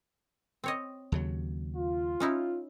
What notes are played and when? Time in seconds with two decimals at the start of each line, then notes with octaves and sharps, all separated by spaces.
0.64 C4 C#5 D#5
1.12 D#2 C#3 F#3
1.76 F4
2.20 C#4 D#4 E4